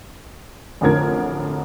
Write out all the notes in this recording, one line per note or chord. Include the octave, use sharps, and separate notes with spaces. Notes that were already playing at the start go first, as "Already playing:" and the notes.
A1 F2 D3 A#4 G#6